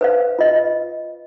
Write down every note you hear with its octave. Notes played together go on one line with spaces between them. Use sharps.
B4 C5 F5
F4 D#5